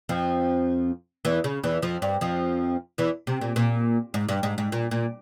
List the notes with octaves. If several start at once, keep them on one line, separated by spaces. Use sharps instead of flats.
F2 F3
E2 E3
C#3
E2 E3
F2 F3
G2 G3
F2 F3
E2 E3
C3
A#2
A#2
G#2
G2
G#2
G#2
A#2
A#2